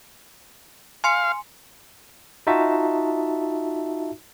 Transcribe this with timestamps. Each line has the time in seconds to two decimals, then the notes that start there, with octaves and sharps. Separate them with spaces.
1.04 F5 G#5 C6 C#7
2.47 D#4 F4 F#4 E5 A5